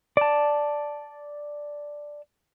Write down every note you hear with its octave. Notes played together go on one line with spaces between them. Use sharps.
D5 A5